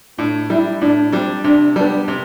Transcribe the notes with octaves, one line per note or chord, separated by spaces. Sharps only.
A2 D4
G3 D4 E4
A2 D4
G3 C4 D4
C3 D4
G3 B3 D4
C3